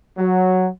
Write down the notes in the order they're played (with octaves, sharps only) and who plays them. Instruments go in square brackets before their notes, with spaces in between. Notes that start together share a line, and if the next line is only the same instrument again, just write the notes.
[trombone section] F#3